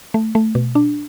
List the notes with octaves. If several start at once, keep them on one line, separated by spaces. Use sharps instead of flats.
A3
A3
B2
D4